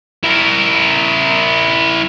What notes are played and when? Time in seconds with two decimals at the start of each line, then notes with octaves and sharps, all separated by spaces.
0.23 E4 A#4